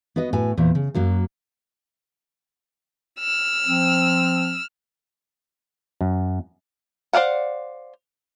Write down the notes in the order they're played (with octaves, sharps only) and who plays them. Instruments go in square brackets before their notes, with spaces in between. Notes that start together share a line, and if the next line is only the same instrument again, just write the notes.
[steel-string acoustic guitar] B3 F#4 B4 D#5
A2 F#4 B4 G#5
E2 A#2 C5
C#3
F#2 F#3 A#3 F#4
[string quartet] E6 F6
[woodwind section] F3 C4
[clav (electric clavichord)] F#2
[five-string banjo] C5 D5 F5 F#5